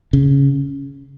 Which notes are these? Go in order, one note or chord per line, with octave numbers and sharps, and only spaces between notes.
C#3